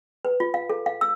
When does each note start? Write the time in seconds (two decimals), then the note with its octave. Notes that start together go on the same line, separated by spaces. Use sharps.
0.25 B4
0.40 F4
0.54 F5
0.70 A4
0.86 F5
1.01 E6